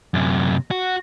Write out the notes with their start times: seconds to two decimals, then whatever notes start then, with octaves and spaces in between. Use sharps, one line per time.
0.14 F#2 C3
0.71 F#4